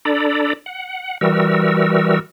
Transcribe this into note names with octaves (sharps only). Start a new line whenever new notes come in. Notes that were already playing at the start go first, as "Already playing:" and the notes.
D4 A4 D5 A#5 B5
F#5
E3 G3 F#4 A#4 E6